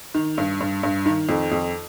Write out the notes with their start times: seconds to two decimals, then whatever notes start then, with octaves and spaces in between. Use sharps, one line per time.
0.15 D#3
0.38 G2
0.60 G2
0.83 G2
1.06 D#3
1.29 F2
1.52 F2